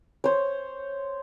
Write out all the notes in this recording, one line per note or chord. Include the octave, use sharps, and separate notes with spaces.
C5 C#5